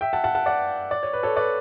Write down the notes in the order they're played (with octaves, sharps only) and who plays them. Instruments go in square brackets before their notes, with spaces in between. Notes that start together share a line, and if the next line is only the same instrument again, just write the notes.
[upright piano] E5 G5
F#5 A5
F#5 A5
F#5 A5
D5 F#5
D5
C#5
B4
A4 C#5
B4 D5